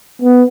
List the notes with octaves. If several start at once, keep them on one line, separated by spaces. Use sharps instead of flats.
B3